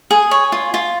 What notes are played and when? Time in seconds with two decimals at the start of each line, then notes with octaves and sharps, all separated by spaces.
0.11 G#4
0.31 C#5
0.52 F4
0.74 F4